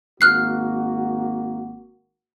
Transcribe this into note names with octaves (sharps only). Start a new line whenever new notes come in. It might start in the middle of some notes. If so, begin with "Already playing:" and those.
G#1 A#3 F#4 F6 F#6 C7